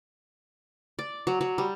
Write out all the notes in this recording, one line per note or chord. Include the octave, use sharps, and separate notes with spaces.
D5
F#3
F#3
G3